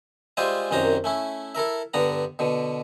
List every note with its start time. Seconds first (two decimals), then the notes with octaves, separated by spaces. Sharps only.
0.37 G3 G#3 F4 C5 E5 G#5
0.71 C2 F#2 D#3 C#4 C5 A#5
1.04 A3 C#4 E4
1.55 E4 A4 A#4 E5
1.94 G2 D3 B3 A#5
2.39 B2 D3